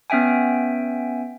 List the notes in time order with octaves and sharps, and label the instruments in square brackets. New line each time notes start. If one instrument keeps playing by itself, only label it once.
[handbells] B3 C#4 E5 G5 G#5